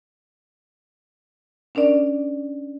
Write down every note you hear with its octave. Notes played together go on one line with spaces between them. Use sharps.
C#4 D4 A#4 D5